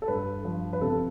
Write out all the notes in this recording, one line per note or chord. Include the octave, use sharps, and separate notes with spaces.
A4
G2 B4
F3
B4
C3 A4